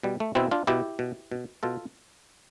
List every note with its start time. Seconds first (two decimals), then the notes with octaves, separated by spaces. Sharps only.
0.03 B2 G3
0.20 A3
0.35 B2 C4 E4
0.51 D4 F4
0.67 B2 E4 G4
0.99 B2
1.32 B2
1.63 B2 F4 A4